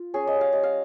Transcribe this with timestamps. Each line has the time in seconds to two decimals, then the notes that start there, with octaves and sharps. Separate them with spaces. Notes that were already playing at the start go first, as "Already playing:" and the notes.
Already playing: F4
0.14 C#4 G#4
0.27 D#5
0.35 G3
0.41 F5
0.53 G3 D#5
0.64 F5